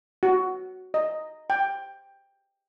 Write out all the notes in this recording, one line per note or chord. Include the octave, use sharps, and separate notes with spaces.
F#4
D#5
G5